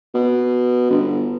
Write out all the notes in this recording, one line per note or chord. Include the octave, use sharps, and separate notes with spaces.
B2
G1